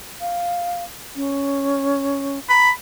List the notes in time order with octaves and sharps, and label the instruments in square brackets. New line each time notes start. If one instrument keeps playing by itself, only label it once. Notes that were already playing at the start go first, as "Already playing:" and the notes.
[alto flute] F5
C#4
[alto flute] A#5 [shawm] B5